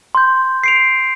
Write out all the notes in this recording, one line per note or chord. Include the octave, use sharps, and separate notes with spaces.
C6 G6
C7 D7 F7